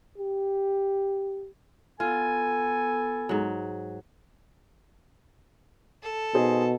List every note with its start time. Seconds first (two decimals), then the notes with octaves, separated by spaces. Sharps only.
0.18 G4
2.00 B3 F4 A4 G#5
3.29 G#2 F#3
6.02 A4
6.35 B2 D#4 G#4 C5